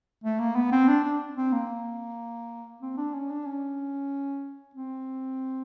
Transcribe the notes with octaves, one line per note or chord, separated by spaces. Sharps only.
A3
A#3
B3
C4
D4
D4
C4
A#3
C4
D4
C#4
D4
C#4
C4